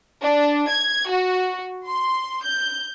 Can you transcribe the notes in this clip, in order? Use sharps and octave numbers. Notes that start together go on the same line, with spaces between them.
D4
G#6
F#4
C6
G6